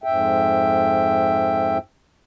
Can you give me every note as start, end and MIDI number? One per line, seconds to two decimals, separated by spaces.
0.04 1.78 41
0.04 1.78 44
0.04 1.78 76
0.04 1.78 79